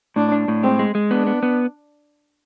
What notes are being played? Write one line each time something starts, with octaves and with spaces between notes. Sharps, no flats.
A2 D4
D4
A2
G#3 C4
G#3
G#3
B3 D4
B3
B3